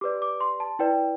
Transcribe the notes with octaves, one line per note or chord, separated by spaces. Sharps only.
G4 B4 D5 D6
D6
C6
A5
E4 B4 D5 G5